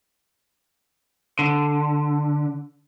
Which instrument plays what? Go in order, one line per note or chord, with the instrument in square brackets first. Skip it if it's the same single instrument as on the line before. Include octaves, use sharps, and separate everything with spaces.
[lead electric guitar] D3